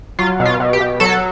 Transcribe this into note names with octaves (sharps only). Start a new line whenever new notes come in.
F#3 F4
B2
F4
B2
G4
B2
F#3 A4